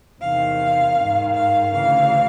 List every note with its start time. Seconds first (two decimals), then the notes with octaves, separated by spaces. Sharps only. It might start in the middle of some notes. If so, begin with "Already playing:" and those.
0.21 E2 C3 D#3 F5
0.97 G#2 D#3
1.34 F5
1.72 D2 C#3 E3 F5